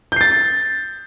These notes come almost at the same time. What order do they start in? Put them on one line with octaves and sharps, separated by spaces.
G6 C7 A6